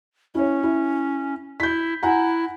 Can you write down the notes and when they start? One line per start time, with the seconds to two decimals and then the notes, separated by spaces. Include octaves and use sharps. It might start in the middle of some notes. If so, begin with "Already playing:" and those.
0.35 C#4 E4 C#5
0.63 E4
1.60 E4 G6 B6
2.03 E4 F#5 G#5 A#5